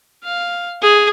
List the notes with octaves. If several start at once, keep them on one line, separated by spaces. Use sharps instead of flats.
F5
G#4